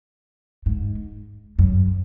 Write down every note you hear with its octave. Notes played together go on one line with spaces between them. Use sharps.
G#2
F#2